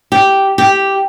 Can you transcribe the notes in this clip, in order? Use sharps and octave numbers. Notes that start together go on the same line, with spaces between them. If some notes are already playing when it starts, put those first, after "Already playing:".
G4
G4